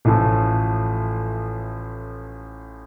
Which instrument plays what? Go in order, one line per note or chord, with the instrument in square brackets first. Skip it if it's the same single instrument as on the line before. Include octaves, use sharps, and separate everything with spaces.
[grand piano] A1 A2 F3 A3